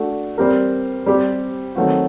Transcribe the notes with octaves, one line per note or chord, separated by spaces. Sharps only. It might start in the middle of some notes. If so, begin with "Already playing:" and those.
Already playing: A3 D4 F#4
G3 C4 G4 A#4
G3 C4 G4
D#3 F#3 A3 C4 F#4